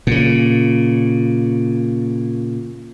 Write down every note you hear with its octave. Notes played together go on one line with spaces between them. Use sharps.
A#2 C#3